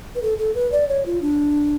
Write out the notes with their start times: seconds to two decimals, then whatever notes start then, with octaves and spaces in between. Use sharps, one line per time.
0.15 B4
0.22 A4
0.38 A4
0.55 B4
0.72 D5
0.88 C#5
1.06 F4
1.21 D4